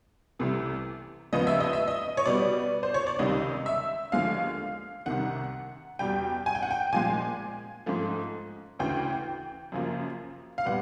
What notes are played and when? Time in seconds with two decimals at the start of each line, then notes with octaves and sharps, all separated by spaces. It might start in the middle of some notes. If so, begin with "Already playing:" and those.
0.39 C2 C3 E3 A3
1.33 D#2 C#3 F3 G#3 B3 D#5
1.47 E5
1.60 D#5
1.73 E5
1.88 D#5
2.17 C#5
2.26 B2 G3 B3 D5
2.83 C5
2.94 C#5
3.07 D5
3.19 C#2 C3 D#3 G3 D#5
3.66 E5
4.12 D#2 D3 F3 G#3 F5
5.06 C2 C3 D#3 F#5
5.99 E2 B2 G3 G5
6.46 G#5
6.55 G5
6.63 F#5
6.71 G5
6.92 A#2 F3 G#3 G#5
7.86 G#2 F3 A3
8.79 D2 C#3 E3 G5
9.72 F#2 C#3 F3 A#3
10.58 F5
10.65 A#2 G3 B3 F#5